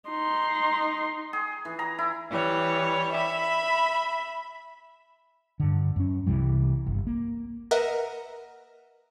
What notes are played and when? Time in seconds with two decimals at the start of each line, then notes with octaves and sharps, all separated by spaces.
0.10 D#4 C6
1.33 G#4
1.65 E3
1.79 A#5
1.98 E4
2.30 E3 G3 C#5
3.13 E5 B5
5.60 G2 D3
5.96 F#2 C#4
6.26 C2 C3 E3 G3
6.87 G1
7.07 A#3
7.71 A#4 B4 D#5 E5 F#5 A#5